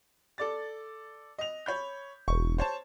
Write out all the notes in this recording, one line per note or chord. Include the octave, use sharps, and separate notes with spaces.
A4 D5 A6
D#5 F7
C#5 B5 G6
E1 C#6
C5 C#5 A5